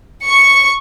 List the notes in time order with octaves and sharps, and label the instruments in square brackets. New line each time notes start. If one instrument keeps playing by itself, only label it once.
[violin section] C#6 C#7